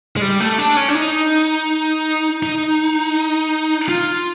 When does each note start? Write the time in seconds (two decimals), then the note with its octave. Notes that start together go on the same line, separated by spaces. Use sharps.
0.17 G#3
0.22 G3
0.40 A3
0.58 D4
0.77 C#4
0.89 D4
0.95 D#4
2.43 D#4
3.89 F4